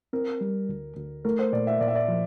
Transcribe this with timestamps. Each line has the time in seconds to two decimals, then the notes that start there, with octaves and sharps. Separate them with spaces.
0.13 C4 A#4
0.41 G3
0.69 D2
0.97 D2
1.25 A3 A#4
1.39 C5
1.53 A#2 D5
1.67 E5
1.81 A#2 D5
1.88 E5
1.95 D5
2.08 F3